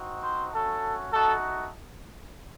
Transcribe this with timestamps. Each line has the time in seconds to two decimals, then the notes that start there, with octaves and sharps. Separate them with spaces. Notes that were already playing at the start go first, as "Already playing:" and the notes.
Already playing: C4 D#4 F#4
0.23 C5
0.53 A3 C#4 F#4 A4
1.13 A3 D#4 F#4 A4